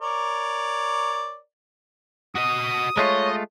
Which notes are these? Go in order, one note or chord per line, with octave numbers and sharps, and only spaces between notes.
A#4 C#5 D5
F#4 D#5 D#6
G#3 A3 F4 C#5 D#5